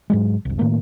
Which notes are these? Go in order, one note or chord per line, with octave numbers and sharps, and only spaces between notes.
G#2 F#3 G#3
F#1 C2
A2 D#3 A3 A#3